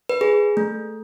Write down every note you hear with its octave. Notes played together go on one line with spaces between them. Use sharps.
B4
G#4
A3